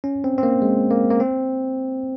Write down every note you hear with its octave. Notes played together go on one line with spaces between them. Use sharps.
C#4
C4
C4
A#3
G#3
A#3
A#3
C4